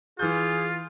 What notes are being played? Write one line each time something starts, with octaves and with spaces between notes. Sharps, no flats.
E3 F4 G#4 G6